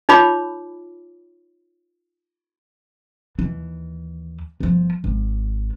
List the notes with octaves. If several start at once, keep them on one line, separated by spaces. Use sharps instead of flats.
D#4 F4 C#5 B5 D6
D#2 E3
G1 F3
G#1